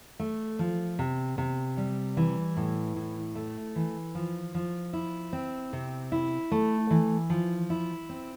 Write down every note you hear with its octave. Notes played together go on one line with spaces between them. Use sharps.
A3
F3
C3
C3
G3
E3
A2
A2
A3
E3
F3
F3
E4
C4
C3
E4
A3
E3
F3
E4
C4